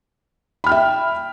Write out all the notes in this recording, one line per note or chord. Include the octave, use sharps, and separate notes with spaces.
E5 G5 B5 F6